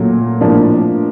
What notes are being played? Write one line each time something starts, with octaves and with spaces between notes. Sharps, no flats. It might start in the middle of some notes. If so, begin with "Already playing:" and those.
Already playing: A#2 F#3 A3
A2 F3 A#3 D4